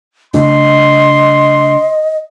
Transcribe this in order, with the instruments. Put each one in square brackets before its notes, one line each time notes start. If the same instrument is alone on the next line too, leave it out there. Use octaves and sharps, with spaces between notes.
[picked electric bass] C#3 A3 D4 [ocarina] D#5 [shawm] C6